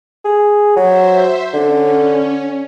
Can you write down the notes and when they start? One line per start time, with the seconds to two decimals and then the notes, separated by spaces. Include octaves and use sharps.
0.25 G#4
0.76 F#3 C5 E5
1.53 D3 C#4